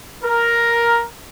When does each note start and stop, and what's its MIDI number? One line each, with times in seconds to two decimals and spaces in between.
0.23 1.05 70